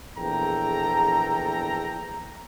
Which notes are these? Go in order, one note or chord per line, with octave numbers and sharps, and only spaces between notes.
A#1 E2 A4 G5 A#5